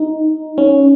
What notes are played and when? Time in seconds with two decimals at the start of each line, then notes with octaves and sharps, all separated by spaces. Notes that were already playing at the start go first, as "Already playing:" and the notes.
Already playing: D#4
0.58 C#4